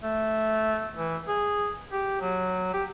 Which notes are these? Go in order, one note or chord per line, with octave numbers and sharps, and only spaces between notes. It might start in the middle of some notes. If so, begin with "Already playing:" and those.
A3
E3
G#4
G4
F#3
G4